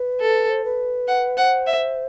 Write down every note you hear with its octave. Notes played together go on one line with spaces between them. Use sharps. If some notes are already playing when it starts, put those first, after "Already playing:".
Already playing: B4
A4
C5
B4
F#5
C5 F#5
E5